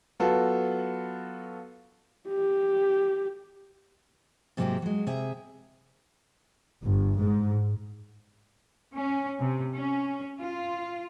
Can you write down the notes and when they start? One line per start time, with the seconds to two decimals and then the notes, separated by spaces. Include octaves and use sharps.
0.20 F#3 B3 F4 F#4 A4
2.29 G4
4.57 G#2 C3 F#3 A#3 C4 G4
4.82 F#3 G#3
5.07 C3 G#4 E5
6.85 G1
7.19 G#2
8.95 C#4
9.39 C3
9.75 C#4
10.38 F4